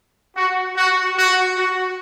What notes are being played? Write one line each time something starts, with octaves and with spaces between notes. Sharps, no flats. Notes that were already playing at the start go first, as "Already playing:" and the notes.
F#4
F#4
F#4
F#4